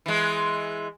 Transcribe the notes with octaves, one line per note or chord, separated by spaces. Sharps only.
E3 G#3